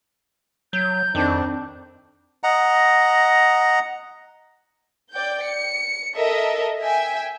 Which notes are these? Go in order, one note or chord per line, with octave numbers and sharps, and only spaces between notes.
F#3 G6
F2 D#3 C4 D4
D#5 F#5 A#5
D5 G5 G6
C#7
A4 A#4 D#5 E5
E5 G5 G#5